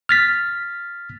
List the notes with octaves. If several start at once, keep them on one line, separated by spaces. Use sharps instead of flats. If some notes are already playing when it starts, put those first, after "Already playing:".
F6 A6 B6